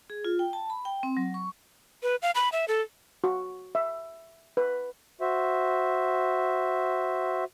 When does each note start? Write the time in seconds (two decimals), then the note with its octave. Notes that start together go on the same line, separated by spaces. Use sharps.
0.10 G#4
0.25 F4
0.39 G5
0.53 A5
0.70 B5
0.85 G5
1.03 C4
1.17 F#3
1.34 C#6
2.03 B4
2.22 F5
2.35 B5
2.52 E5
2.68 A4
3.24 F#4
3.75 E5
4.57 B4
5.21 F#4 C5 E5